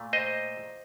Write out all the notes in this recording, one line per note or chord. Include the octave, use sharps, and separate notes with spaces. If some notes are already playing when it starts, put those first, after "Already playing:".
Already playing: A#2 A3
C5 D#5